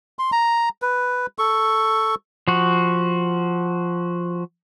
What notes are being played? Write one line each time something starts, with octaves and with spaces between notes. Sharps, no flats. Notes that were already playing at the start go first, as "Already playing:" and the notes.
C6
A#5
B4
A4 C#6
F3 F#4